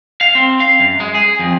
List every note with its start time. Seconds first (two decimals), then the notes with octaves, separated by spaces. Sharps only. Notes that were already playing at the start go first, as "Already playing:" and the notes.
0.21 F5
0.35 C4
0.60 F5
0.79 F#2
1.00 G#3
1.15 G#4
1.39 F2